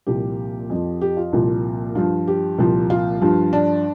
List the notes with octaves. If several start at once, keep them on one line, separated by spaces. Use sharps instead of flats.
C2 A#2 F3 G4
F2 F3
G4
F4
C2 A#2 F3
G2 F3 F4
G4
C2 A#2 F3
F4
G2 F3
D4